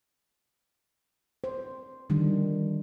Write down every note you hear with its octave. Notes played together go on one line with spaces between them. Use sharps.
C5
D3 D#3 F3 G3 D4